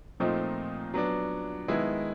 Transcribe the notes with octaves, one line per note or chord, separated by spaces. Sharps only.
A#2 F3 A3 C4 D#4
F#3 B3 D4
D#3 G#3 B3 E4